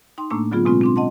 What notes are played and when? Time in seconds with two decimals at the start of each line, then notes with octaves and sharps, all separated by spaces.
0.18 D#4 G5 C6
0.30 A2 A3 A#3 D4 E6
0.51 D3 F#3 B3 F4 G#4
0.65 B2 G#3 C4 C#4 F4
0.81 C4 D4 C6
0.96 D#5 F#5 A5 C6